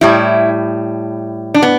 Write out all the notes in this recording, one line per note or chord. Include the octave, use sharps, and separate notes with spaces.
A2 G3 E4
D4
B3